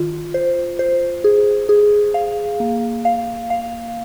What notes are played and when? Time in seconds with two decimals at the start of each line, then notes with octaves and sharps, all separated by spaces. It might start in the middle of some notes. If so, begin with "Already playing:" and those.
Already playing: D#3 F4
0.34 C5
0.79 C5
1.24 G#4
1.69 G#4
2.14 F5
2.60 A#3
3.05 F5
3.50 F5